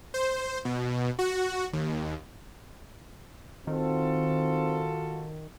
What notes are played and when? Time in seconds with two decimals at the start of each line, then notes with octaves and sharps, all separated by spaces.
0.14 C5
0.65 B2
1.19 F#4
1.73 D#2
3.67 D#3 C4 F4 F#4 A4